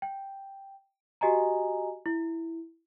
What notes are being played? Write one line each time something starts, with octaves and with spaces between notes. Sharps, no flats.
G5
F#4 G4 D#5 G#5 A#5
E4